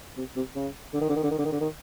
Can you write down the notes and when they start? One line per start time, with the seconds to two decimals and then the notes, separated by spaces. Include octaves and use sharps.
0.17 C3
0.36 C3
0.55 C#3
0.93 D3
1.01 D#3
1.09 D3
1.16 D#3
1.23 D3
1.31 D#3
1.38 D3
1.45 D#3
1.52 D3
1.60 D#3